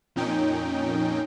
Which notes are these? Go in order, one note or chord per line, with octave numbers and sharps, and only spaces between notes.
F2 A#2 C#4 D#4 G5